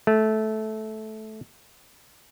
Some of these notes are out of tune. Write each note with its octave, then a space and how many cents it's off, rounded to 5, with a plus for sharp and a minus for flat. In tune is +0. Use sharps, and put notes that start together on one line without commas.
A3 -15